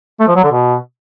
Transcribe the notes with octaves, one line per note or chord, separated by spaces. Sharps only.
A3
F3
F#3
D3
B2